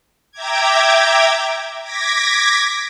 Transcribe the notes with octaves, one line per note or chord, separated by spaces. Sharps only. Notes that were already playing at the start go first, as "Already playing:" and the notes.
E5 G5 A#5 D6 G#6
D6 G#6 A#6 B6